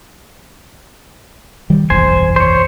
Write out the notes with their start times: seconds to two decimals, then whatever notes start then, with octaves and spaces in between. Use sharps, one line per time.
1.70 D#3 G3
1.90 F#1 B1 E2 C5 G#5
2.36 C5 C#5